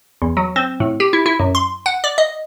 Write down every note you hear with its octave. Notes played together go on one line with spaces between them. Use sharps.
E2
F#3
C4
A2
G4
E4
E4
F#2
C6
F#5
D5
D#5